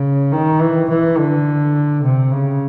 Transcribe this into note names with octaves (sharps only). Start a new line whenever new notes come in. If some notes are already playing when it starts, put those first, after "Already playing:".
Already playing: C#3
D#3
E3
E3
D3
C3
C#3